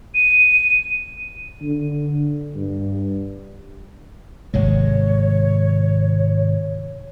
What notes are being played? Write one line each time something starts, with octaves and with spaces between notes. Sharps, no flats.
D#7
D3
G2
G#1 C3 G#3 C#5